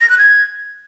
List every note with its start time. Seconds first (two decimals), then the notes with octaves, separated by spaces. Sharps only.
0.01 A#6
0.10 F#6
0.18 G#6